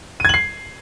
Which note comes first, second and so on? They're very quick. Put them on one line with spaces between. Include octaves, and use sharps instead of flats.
D#7 G#6 F#7 C7